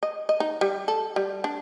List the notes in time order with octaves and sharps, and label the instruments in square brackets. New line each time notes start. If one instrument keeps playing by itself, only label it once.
[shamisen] D#5
D#5
D#4
G3
A4
G3
D4